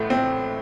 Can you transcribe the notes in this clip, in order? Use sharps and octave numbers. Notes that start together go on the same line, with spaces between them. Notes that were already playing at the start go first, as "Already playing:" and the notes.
Already playing: A1 A2 A3
C4